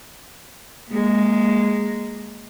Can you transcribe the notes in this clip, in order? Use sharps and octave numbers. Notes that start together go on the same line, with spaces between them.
G#3 A#3